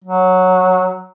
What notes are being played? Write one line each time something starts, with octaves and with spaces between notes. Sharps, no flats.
F#3